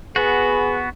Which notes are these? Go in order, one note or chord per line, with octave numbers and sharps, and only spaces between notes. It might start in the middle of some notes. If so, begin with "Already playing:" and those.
B3 F#4 G#4 B4